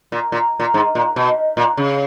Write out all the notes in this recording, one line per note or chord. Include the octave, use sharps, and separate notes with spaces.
A#2
A#2
A#2
G#2
A#2
B2
A#2
C#3